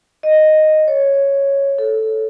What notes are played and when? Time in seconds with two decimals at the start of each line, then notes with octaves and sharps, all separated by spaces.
0.23 D#5
0.88 C#5
1.78 A4